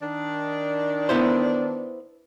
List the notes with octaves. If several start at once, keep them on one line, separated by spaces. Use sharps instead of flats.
D#3 D4
B3 E4 C5